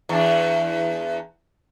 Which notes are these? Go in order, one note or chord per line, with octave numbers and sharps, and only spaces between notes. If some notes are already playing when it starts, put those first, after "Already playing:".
E2 D4